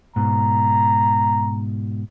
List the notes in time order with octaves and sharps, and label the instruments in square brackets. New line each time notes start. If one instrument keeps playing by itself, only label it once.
[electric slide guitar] G#2 B2 [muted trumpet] A#5